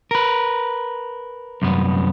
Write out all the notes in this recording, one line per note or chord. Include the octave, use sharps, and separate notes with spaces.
A#4 B4
C2 F#2 B3